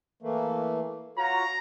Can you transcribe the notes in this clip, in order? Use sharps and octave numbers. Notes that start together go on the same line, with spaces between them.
E3 A3 A#3
F4 F#4 C#5 A#5